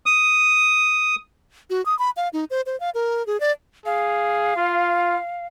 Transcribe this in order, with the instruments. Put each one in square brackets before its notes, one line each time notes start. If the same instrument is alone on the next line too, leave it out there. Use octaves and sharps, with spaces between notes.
[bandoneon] D#6
[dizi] F#4
D#6
B5
F5
D#4
C5
C5
F5
A#4
G#4
D5
[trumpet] G#4 [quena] F5
[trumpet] F4